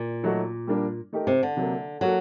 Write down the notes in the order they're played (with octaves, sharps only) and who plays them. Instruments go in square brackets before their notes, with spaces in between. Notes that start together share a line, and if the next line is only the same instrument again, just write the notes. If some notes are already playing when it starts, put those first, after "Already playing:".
Already playing: [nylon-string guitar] A#2
[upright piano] F#3 A3 D#4 F#4
G3 A#3 D4
A3 D#4 G4 A#4
[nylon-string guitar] C3
D3
[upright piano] C3 F#3 A#3
[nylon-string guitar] F#3 [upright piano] A#3 F#4 A4